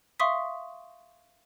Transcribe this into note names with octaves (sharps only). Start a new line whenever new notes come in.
E5 F5 C6 C#6 D#6 B6